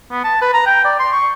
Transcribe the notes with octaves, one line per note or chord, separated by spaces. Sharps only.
B3
A5
B4
A#5
G5
D5
C6
C#6